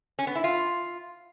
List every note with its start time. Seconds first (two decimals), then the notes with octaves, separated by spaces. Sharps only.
0.19 C#4
0.27 B3
0.35 E4
0.44 F4